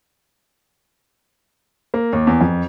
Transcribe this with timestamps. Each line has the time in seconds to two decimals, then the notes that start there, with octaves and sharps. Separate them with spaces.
1.94 A#3
2.13 D#2
2.27 E2
2.41 F2